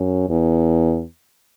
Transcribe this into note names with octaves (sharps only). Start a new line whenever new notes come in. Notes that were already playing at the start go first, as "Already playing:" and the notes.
Already playing: F#2
E2